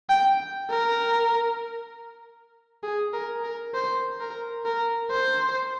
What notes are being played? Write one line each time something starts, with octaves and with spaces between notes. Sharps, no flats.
G5
A#4
G#4
A#4
A#4
C5
A#4
A#4
C5